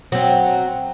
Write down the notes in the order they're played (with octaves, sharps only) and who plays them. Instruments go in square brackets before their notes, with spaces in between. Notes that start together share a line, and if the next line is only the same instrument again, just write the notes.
[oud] F#3 C4